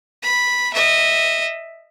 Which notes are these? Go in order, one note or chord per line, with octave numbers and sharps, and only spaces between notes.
B5
D#5 E5